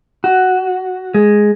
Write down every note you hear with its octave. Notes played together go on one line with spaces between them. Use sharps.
F#4
G#3